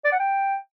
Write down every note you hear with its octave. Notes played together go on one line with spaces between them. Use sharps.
D5
F#5
G5